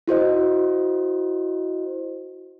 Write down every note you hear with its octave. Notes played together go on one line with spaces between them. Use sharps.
E4 F#4 C5 D#5